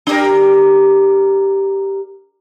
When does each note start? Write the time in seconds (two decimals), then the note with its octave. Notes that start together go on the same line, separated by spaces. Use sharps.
0.07 D4 G4 A#4